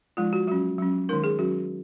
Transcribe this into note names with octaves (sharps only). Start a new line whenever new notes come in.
F3 G#3 D#4 F4
F#4
F#3 C#4 F#4
F#3 C#4
D#3 G#3 D#4 A#4
G#4
F#3 C#4 F#4